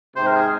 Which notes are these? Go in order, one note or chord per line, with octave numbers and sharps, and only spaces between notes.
G#2 C3 C5
A#4
G#4